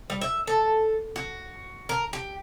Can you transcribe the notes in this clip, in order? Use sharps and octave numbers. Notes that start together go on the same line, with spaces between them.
G3
E5
A4
F#4
A#4
G4